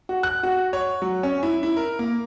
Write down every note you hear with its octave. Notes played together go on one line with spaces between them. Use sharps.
F#4
F#6
F#4
C#5
F#3
C#4
E4
E4
A#4
A#3